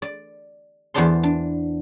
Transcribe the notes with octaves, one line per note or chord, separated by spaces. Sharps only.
D5
E2 B3 C5 D5 A5 C6
D4